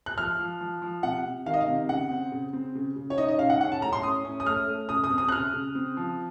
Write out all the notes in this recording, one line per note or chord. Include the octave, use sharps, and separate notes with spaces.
F#6
F3 F6
F3
F3
F3
C3 F#5
C3
D#3 F5
D#5
F5
C3
C#3 F#5
C4
C#3
C4
C#3
C#3
C#5
D#4 D#5
D#5
C#3 F5
F#5
C#4 F#5
A5
A2 A#5
C6
C#4 D#6
C#4
D#6
A3 F6
A3
C#3 D#6
D#6
C4
D#6
F#6
C#3 F6
C#3
C4
F3